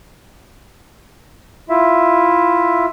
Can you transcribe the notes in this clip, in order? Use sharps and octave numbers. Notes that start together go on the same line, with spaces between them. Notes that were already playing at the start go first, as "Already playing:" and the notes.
E4 F4 E5